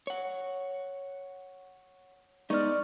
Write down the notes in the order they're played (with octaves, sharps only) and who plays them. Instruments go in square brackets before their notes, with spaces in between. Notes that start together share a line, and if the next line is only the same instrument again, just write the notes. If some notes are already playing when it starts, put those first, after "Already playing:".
[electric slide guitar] C#5 F#5
[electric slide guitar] G#3 B3 [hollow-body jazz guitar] D#4 [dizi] D5 [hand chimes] C#6 F6